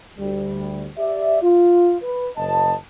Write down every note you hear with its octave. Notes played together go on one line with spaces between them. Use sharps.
D2 G3
G4 D5 E5
F4
B4
F#1 D#5 A5